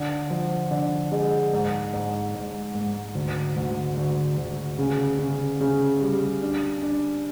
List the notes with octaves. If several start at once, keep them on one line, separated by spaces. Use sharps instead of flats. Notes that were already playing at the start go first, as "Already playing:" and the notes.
Already playing: D3
F3
D3
G#3
G#2
G#2
G#2
G#2
D2
D2
D2
D2
C#3
C#3
C#3
G3
D4
D4